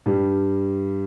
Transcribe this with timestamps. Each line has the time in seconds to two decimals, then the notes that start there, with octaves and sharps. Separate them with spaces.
0.06 G2 G3